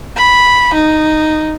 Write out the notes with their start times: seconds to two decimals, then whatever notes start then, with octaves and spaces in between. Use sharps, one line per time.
0.16 B5
0.74 D#4